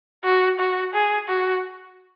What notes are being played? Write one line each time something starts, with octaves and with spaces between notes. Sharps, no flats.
F#4
F#4
G#4
F#4